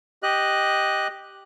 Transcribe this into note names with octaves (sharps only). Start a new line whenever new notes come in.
G4 D#5 F#6